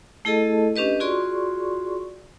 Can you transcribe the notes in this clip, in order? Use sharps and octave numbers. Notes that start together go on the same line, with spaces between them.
A3 E4 G#4 A4 D#5 A5
C#4 D4 G4 B4 D#5
F4 F#4 G#4 D5 C6 C#6